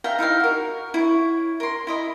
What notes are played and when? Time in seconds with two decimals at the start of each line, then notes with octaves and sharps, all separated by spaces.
0.04 E5 F5 G5 A#5
0.19 D#4 E4 E5 F5
0.40 F#4 A#4
0.94 E4 C#5
1.60 A#4 C6
1.87 E4 D#5 B5